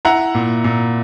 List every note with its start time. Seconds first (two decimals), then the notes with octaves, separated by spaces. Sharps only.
0.05 E4 F#5 A#5
0.35 A#2
0.64 A#2